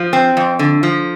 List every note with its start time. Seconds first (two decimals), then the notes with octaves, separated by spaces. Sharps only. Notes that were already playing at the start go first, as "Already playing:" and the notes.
Already playing: F3
0.13 C4
0.37 F2
0.59 D3
0.83 F3